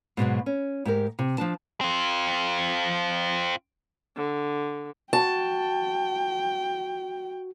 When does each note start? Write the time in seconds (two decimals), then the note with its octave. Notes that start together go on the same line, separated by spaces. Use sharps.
0.17 G#2 B2 F3 F#3
0.46 C#4
0.85 G#2 G4 A#4
1.19 C3
1.38 F3 D4 A5
1.81 C4 F4
4.16 D3
5.13 F#4 G5 A5